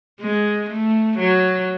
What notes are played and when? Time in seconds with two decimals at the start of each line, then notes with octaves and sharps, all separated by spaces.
0.21 G#3
0.70 A3
1.19 F#3